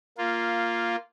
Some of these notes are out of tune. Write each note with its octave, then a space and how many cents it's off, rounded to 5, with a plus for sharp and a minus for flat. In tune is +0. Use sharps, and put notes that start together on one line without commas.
A#3 +0 F4 -5